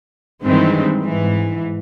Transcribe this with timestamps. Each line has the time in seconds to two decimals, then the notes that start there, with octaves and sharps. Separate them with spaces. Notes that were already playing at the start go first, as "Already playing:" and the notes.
0.43 G2 D#3 E3 G#3 C4
1.03 G#2 E3